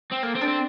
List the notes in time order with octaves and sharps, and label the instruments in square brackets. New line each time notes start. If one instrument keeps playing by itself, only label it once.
[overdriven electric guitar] C4
[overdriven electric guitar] A#3 [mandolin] A4
[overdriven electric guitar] C4
[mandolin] D4
[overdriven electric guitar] C4